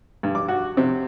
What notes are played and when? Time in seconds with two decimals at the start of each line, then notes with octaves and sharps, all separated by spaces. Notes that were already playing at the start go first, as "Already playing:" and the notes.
0.23 G2
0.35 D6
0.48 F#4
0.77 C3